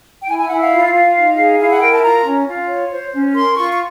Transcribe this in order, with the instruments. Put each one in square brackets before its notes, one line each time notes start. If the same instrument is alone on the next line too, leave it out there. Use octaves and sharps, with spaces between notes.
[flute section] G5
E4 G#5
G#5
E4 F#5
F5
F4
F4
D#4
G#4
E4 F5
F#5
A#4 G5
A5
F4 A#5
C#4
F4
C#5
C5
C#4
A#4 C6
F4 C#6
C#6